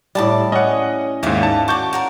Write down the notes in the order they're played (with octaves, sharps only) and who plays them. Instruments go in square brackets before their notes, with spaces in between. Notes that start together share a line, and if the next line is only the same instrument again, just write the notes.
[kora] A2 G3 [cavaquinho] D5 A5 D6
[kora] C#4 [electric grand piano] D#5 F#5
[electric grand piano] D#2 G#2 [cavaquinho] D5 E5 F5
[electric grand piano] A5
[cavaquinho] F#4 D6 [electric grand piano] A5 C#6 G6
[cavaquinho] F#4 A#4 C#5